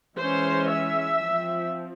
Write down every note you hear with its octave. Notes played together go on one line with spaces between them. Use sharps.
E3 G#3 C#4 C5
E5
F3 C4